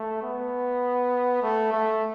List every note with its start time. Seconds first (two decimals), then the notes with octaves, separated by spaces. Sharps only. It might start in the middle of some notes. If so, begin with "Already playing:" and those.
Already playing: A3
0.22 B3
1.42 A3
1.72 A3